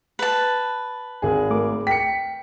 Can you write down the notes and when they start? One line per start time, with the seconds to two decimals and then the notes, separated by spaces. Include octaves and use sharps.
0.19 B4 A5
1.22 G#1 G#4
1.51 A3 A#4 D6
1.87 G5 B6 C#7